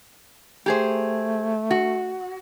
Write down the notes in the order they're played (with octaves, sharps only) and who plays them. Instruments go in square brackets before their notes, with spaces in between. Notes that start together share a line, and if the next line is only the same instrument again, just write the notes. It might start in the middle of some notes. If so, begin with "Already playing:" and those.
[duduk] A3 [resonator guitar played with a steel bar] G4 G#4 C5
[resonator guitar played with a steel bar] F#4